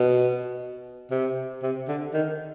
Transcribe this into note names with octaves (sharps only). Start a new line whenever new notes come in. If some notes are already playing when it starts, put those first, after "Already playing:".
Already playing: B2
C3
C3
D3
D#3